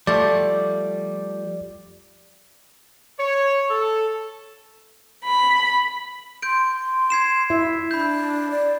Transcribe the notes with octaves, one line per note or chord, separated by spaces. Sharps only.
F3 G3 A3 D5
C#5
A4
B5
C6 G6 D7
G#6 C7 E7
E4 E5
D4 B5 G6
D5